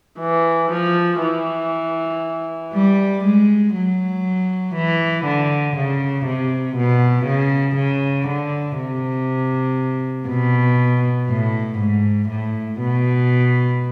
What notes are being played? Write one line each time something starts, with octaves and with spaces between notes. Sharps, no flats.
E3
F3
E3
G3
G#3
F#3
E3
D3
C#3
C3
B2
C#3
C#3
D3
C3
B2
A2
G#2
A2
B2